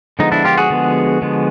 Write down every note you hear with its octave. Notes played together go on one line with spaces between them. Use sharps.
D3 F3 G#3 B3 D#4
D4 E4
F4 G4
F#4 G#4
D3 F3 G#3 B3
D3 F3 G#3 B3